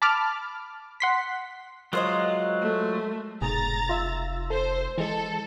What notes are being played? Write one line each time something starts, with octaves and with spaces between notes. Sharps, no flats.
A5 B5 D6 F6
F#5 C6 B6
F#3 G#3 F4 A#4 C5 D#5
A3
F1 G#2 B2 G#4 A#5 A6
F4 E5 E6
A4 C5
E3 G#3 A4